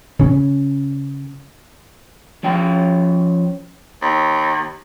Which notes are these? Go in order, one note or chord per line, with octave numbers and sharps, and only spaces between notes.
C#3 C#4
F3 C#4 G5
D#2